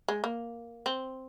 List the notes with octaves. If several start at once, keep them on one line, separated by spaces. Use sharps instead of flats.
G#3
A#3
C4